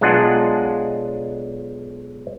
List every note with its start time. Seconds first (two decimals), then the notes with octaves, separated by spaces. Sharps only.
0.01 B1 G#3 D4 F4 D#5 F#5